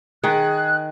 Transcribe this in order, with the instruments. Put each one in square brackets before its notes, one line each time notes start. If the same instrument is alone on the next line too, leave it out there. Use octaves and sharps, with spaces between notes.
[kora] D#3 [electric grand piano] G#4 [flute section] F#6